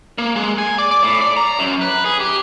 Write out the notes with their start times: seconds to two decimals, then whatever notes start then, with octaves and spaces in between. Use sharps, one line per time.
0.18 A#3
0.36 G#3
0.58 G#5
0.78 D5
0.91 D5
1.03 A2
1.21 D5
1.37 A#5
1.59 F#2
1.81 B4
2.05 G#4
2.20 G4